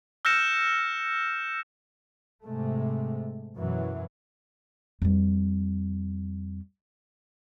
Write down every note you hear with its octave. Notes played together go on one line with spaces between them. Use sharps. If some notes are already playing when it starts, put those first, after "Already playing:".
E6 F6 G6 A#6 C#7 E7
G#2 C3 G#3 A3
F#2 B2 E3 F#3
F2 G3